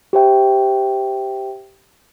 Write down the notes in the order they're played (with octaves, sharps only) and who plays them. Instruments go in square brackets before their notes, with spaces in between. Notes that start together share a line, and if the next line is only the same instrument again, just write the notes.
[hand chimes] G4 C5 E5 G5